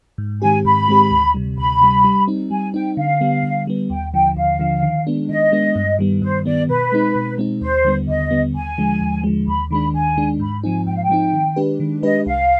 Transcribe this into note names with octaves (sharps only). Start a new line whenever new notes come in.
G#2
D#3 G#3 C4 G4 G#5
G#2 B5
D#3 G#3 C4 G4
D2
C3 G3
D2 B5
C3 G3
G3
C4 D#4
G3 G#5
C4 D#4 G5
D3 F5
G3 B3
D3
G3 B3
D#2 G5
D3 F3 G5
D#2 F5
D3 F3
D#3
G#3 B3 D4
D#3 D#5
G#3 B3 D4
G2
D#3 G3 B3
G2 C5
D#3 G3 B3 D5
B2 B4
G#3 C4 D#4
B2
G#3 C4 D#4
D#2 C5
D3 G3 B3
D#2 D#5
D3 G3 B3
D#2 G#5
D3 F3 G#3
D#2
D3 F3 G#3
D#2 B5
D#3 G#3 D4 B5
D#2 G#5
D#3 G#3 D4
G#2 B5
F3 C4 D#4 G#5
G#2 G5
F5
G5
F3 C4 D#4
D#3
G#3 D4 G4 B4
D#3
G#3 D4 G4 B4 D#5
C2 F5